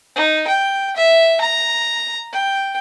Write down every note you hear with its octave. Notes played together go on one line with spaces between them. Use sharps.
D#4
G5
E5
A#5
G5